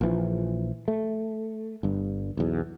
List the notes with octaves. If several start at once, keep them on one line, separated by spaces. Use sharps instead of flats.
A#1 E3 F3
A3
G1 G2
B1 E2